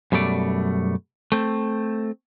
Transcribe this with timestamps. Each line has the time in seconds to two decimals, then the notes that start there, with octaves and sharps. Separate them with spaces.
0.12 F#2 B2 G3 A3 D5
1.32 A3 C4